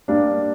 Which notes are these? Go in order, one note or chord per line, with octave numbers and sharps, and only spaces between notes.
G3 A#3 D4